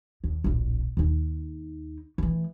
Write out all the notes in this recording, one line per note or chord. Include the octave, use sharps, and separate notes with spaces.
D#2
D1 A#1
D#2 D#4
E3 A3